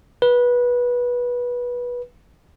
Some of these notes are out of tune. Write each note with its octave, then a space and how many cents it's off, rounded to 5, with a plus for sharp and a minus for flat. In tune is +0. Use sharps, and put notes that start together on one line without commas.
B4 -20